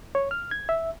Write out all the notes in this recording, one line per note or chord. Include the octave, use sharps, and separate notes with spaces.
C#5
F6
G#6
E5